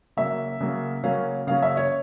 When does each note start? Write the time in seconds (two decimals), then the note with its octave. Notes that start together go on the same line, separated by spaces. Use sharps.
0.17 C#3 F#3 A#3 E5
0.60 C#3 F#3 A#3
1.03 C#3 F#3 A#3 C#4 F5
1.47 C#3 F#3 A#3 C#4 F5
1.62 E5
1.77 C#5